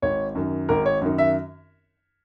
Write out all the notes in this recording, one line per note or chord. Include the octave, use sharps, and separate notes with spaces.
G#1 C#5
F#2 D#3
G#1 A#4
C#5
F#2 D#3
E5